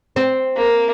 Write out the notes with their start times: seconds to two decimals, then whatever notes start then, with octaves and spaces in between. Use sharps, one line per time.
0.16 C4
0.57 A#3